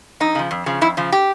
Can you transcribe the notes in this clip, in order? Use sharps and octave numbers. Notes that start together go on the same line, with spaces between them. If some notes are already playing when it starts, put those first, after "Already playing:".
F2 D#4
C#3 F3
F2
C#3 F3
F2 E4
C#3 F3
G4